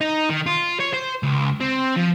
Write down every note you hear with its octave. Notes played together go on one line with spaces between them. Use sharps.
D#4
D#3
F4
C#5
C5
C#2
C4
F3